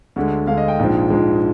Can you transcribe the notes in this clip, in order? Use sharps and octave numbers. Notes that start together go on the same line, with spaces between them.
D2 D3 G#3
D2 D3 G#3 F5
D#5
G5
A#1 G#2 F3 G#3
A#1 G#2 F3 G#3